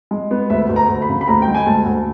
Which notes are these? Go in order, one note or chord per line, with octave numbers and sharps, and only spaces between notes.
G#3
B3
D2 E5
D2
A#5
D2
B5
C#3
B5
D2 A#5
G5
G#3
G#5
D2 A5
D2